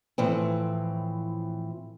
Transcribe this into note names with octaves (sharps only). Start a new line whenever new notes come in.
A2 E3 F3 C4